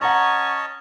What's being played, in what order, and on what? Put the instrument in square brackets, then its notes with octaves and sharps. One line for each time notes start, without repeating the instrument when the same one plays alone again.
[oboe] C#4 [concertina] C#5 D#5 A5 [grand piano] F#5 A#5 [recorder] C#6